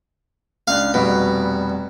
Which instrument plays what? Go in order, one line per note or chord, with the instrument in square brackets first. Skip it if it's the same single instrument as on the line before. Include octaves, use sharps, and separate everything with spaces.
[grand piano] C#2 D4 F#6 [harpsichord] F5
[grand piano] F1 G3 F#4 [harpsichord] B2